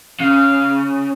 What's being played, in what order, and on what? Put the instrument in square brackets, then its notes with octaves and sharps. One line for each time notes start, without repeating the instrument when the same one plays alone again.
[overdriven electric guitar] C#3 [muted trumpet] F5